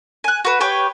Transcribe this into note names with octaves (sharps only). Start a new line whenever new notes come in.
G#5 F#6
F#4 B4
G4 B4 C#5 G5